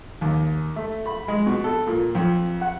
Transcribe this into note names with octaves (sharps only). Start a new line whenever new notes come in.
D#2
A3
B5
G#3
B2
A4
A#2
F2
F#5